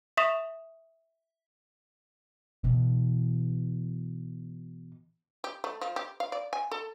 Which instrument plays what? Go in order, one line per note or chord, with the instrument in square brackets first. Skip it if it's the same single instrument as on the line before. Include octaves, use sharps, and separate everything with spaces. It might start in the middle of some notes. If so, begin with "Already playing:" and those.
[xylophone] E5 C#6 D#6 B6 E7 F7
[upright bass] B2 E3
[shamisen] G4
A3
F3
G4
F5
D5
G#5
A4